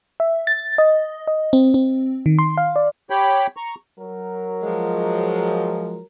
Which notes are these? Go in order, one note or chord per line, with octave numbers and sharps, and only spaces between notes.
E5
A6
D#5
D#5
C4
C4
D#3
C6
F5
D5
G4 C#5 G5 B5
A#5 C#6
F#3 A#4
F3 G#3